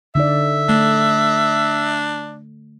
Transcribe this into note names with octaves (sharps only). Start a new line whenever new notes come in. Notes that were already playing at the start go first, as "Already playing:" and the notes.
D3 D#4 D5 E5
A3 D4